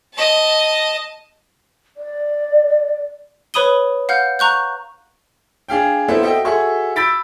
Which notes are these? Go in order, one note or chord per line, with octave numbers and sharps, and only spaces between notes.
D#5 A5
D5
B4 C#5 B5 D#6 D#7 G7
F5 F#5 F6 G6
A#5 C#6 F#6 G6
D4 G#4 F5 G5
B3 C4 E4 A4
F#4 A4 D#5 E5 G5
F#4 G#4 A4 E5 C#6
B5 E6 G6 A6 B6 D7